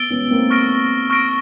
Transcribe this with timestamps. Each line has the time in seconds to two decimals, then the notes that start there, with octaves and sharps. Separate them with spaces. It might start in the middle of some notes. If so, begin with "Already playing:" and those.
Already playing: B3 E6 A6 D7 G7
0.10 B3 C#4
0.30 A#3 C4
0.50 C#6 F6 A#6 D7
1.10 C#6 F6 A#6 D7